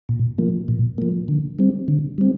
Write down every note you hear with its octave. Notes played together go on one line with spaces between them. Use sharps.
A#2
F3 A#3
A#2
F3 A#3
D3
G3 C4
D3
G3 C4